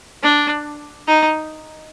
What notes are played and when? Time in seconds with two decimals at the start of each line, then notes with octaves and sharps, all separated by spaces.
0.22 D4
1.07 D#4